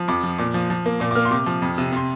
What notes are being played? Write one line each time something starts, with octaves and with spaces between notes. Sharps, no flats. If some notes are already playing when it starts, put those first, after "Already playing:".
Already playing: F3
F2 D6
F3
A#2 D6
F3
F3
A#3
A#2 D6
D6
A#3 F6
C6
C3 D6
F3
F2
C3
C3 C6